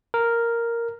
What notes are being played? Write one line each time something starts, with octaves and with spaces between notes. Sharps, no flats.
A#4